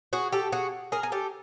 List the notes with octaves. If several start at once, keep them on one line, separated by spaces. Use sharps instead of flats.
F#4 G#4
G4 A4
F#4 G#4
G#4 A#4
G#4
G4 A4